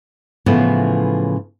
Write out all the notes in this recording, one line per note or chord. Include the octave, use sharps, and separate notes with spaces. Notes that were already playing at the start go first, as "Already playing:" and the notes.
A2 C#3 E3 F3 A3 B3